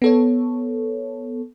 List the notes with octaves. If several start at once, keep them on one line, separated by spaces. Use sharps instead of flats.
B3 A4 C#5